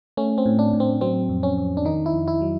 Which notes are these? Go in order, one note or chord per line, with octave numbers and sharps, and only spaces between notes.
A3 C#4
C4
A2
D4
A2
C4
F#3 C4
F2
C#4
F2
D4
D#3 D#4
E4
F2
E4
F#3